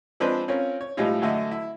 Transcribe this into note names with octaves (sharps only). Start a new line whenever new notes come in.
F3 G#3 C4 D4 B4 C5
C4 C#4 F4 A#4 C#5
C#5
A2 F3 G3 G#3 D#4 F4
F#2 D3 A3 D#5
E4